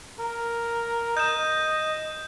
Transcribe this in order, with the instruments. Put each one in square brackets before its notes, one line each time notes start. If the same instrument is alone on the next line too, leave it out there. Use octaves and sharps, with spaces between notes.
[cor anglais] A#4
[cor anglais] D#5 [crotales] G6 E7